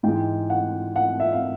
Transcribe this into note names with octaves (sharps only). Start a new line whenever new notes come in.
G#2 E3 G#3 G5
F#5
F#5
E5
F5